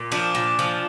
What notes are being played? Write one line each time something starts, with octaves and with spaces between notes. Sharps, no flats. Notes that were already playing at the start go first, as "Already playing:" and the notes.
Already playing: A#2
F3 D4
A#2
F3